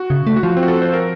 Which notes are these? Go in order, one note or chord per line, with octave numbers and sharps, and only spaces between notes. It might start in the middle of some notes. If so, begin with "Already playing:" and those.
Already playing: F#4
C#3
A3
F#4
F3 F4
C4
F#4
A4
C5
A#4